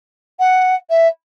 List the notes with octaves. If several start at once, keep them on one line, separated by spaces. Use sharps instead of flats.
F#5
E5